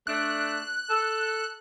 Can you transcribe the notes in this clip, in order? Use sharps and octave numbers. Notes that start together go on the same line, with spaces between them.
A3 D4 F#6
A4